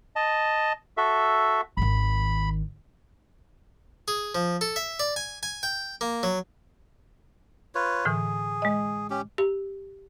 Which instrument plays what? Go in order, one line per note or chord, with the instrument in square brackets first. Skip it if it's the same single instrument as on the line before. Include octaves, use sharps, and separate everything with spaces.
[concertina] D#5 A5
F#4 A4 E5
[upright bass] G#1 D#3 [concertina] B5
[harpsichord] G#4
F3
A4
E5
D5
G#5
G#5
G5
A#3
F#3
[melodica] F4 B4 C#5
[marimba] A2 D3 E3 [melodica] G#4
[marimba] G#3 D#5
[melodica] C#4 G4
[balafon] G4